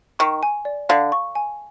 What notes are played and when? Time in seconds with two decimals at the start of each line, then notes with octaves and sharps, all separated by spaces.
0.19 D#3 C#6
0.43 G#5
0.65 D5
0.89 D3 F5
1.12 C#6
1.35 G#5